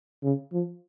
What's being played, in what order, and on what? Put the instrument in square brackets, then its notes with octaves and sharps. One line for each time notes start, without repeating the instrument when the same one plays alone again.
[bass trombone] C#3
F3